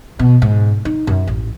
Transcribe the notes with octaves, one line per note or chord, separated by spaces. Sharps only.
B2
G#2
D#4
F#2
A1